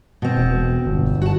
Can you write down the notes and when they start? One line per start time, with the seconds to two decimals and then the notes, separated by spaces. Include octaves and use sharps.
0.22 B2 C4
0.37 E1
0.86 G1
1.22 F#4 A5